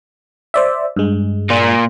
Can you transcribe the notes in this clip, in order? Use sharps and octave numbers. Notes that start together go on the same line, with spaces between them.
C5 D5 E5
G2 G#3
A#2 A#3